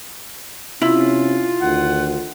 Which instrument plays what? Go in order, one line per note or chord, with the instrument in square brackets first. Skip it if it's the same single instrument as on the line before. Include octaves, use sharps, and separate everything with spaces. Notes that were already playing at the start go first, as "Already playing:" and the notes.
[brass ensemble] C3 C#4 [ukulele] E4 [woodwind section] F4
[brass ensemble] D2 D#3 [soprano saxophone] F#5